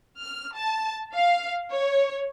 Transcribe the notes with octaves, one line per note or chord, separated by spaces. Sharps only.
F6
A5
F5
C#5